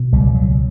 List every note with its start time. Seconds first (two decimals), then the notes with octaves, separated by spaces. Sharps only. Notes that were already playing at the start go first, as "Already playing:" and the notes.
Already playing: B2
0.13 C#2 G3
0.35 F#3